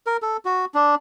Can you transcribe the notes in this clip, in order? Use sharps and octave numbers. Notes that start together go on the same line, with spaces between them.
A#4
A4
F#4
D4